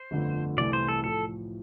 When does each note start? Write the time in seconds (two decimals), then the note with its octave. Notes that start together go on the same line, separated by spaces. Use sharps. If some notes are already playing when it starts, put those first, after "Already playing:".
Already playing: C5
0.11 G1 F2 D3 A3
0.57 C2 C3 E3 A3 E4 D5
0.73 C5
0.88 A4
1.04 A2 F3 A4